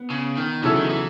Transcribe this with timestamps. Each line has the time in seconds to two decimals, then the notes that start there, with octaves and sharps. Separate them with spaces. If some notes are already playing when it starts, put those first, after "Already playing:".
Already playing: B3
0.10 C#3
0.37 D#3
0.63 C#3 E3 F#3 C#4 E4 A4
0.76 D#3
0.89 E3